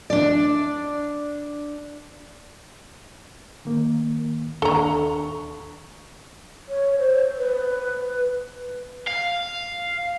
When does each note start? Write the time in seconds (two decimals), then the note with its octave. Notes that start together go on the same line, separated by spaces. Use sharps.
0.10 D4 D5
3.65 D#3 A#3
4.62 D#2 D4 A4 A#5 C#6
6.69 C#5
6.99 C5
7.38 B4
9.08 F5